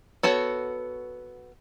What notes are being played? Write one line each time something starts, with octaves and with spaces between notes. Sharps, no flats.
B3 F#4 A4 C#5